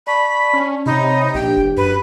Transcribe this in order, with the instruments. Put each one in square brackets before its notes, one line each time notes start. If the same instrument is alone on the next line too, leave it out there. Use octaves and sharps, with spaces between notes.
[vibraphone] D5 A5 C#6 [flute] B5
[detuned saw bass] C#4
[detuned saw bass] C3 [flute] D#4 [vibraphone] C#5 B5
[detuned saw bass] A#1 [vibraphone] D4 G4 [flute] G5
[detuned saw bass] F1
[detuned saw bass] F#2 [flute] B4